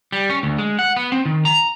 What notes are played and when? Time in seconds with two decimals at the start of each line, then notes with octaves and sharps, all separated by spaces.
0.12 G3
0.29 C#4
0.43 D2
0.58 G#3
0.79 F#5
0.97 B3
1.12 C4
1.25 D#3
1.45 A#5